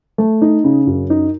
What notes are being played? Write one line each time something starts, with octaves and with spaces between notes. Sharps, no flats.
A3
D#4
C#3
F#2
D#4